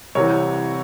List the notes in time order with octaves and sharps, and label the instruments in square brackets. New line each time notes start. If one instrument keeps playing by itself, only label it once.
[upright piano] C2 C3 E3 C#5